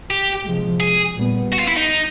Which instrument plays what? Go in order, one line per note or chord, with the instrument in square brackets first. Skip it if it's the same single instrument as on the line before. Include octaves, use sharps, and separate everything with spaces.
[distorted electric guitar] G4
[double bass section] C3 F3 G#3
[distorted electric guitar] G#4
[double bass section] A#2 G3 B3
[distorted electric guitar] F#4
F4
E4
D#4